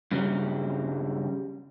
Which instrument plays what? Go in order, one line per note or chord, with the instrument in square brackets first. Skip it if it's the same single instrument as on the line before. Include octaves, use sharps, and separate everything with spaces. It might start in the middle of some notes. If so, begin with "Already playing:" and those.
[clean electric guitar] G2 C#3 E3 F#3 G3